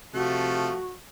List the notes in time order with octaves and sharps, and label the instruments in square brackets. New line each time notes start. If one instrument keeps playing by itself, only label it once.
[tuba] C3 [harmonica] F3 A3 [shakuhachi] F#4